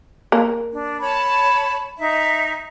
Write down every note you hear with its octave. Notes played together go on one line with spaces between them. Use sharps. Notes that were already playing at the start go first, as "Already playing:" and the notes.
A#3
D4
C#5 A5 B5
D#4 E5